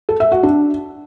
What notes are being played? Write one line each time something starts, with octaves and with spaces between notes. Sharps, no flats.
A4
E5
F#4
D4